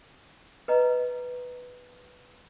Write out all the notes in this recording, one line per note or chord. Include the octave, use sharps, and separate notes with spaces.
B4 D#5 A#5